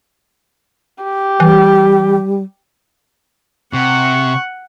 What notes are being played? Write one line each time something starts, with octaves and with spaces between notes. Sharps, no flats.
G4
E3 G3
C3 F#5 C#6